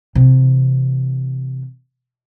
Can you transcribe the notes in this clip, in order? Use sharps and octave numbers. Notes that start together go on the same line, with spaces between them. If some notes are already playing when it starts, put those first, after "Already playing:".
C3 E3